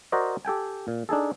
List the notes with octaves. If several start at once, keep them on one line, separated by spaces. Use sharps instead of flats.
F#4 A#4 C5 D5 D#5
G4 A4 G5 G#5
A#2
D4 D#4 G#4 A4